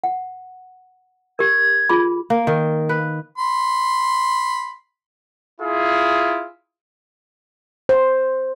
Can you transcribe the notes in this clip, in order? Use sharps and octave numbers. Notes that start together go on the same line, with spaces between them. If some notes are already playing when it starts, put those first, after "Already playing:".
F#5
G4 A#4 G#6
F4 G#4 B5
A#3
D#3
B4
B5 C6
E4 F4 G#4
C5